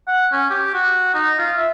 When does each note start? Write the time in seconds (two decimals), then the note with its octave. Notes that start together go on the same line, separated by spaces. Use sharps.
0.07 F#5
0.32 C#4
0.50 G4
0.74 F#4
1.14 D#4
1.39 F4
1.57 E5